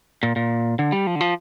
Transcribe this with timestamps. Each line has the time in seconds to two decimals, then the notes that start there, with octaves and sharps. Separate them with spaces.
0.23 A#2
0.36 A#2
0.79 D3
0.92 G3
1.07 F3
1.16 D3
1.21 F3